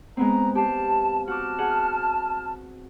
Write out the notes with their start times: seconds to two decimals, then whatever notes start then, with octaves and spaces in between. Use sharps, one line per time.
0.17 G#3 B3 C4 A#5
0.55 G4 F5 A5
1.28 F#4 A5 D6 F6
1.58 G#4 F#5